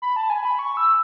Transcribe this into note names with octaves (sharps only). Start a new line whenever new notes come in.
B5
A5
G#5
B5
C#6
E6